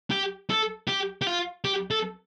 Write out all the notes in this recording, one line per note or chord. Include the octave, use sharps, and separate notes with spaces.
G4
A4
G4
G4
F4
G4
A4